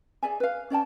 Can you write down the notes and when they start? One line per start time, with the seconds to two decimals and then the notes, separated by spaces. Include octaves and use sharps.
0.23 G#4 D5 E5 G#5
0.40 B4 F5
0.70 C#4 D5 G5 A5